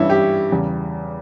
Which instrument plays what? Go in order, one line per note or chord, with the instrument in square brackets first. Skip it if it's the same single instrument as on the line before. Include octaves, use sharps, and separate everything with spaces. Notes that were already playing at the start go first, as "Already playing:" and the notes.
Already playing: [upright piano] G2 E3 G3 C#4 E4
G4
E2 C#3 G3